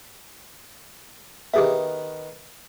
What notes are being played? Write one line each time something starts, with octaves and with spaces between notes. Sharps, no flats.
D#3 B3 G4 G#4 E5